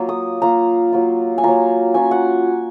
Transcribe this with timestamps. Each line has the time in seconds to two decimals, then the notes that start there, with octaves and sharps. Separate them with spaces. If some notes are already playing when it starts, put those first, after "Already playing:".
Already playing: F#3 A#3 F4
0.09 D#6
0.42 F#3 A#3 F4 A#5
0.93 F#3 A#3 F4
1.38 G#5
1.43 F#3 A#3 F4 A#5
1.94 F#3 C#4 F4 G#5
2.11 F#5